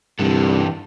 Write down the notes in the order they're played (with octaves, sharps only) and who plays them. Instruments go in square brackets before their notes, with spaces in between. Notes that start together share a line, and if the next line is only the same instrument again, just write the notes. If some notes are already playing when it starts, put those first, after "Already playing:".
[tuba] C2 [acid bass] G2 [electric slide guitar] E3 D4 A4